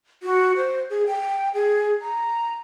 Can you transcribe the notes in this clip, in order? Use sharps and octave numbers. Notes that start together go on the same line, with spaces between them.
F#4
C5
G#4
G5
G#4
A#5